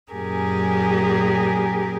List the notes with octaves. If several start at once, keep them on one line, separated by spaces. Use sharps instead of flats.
F#2 A#2 G4 G#4 A#4 G#5